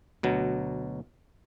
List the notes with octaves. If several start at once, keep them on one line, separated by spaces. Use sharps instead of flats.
D2 B2 F#3